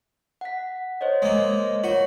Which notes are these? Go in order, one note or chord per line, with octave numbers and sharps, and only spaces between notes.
F#5 B6
C5 C#5 D#5
G#3 A#3
F4 F#4 C#5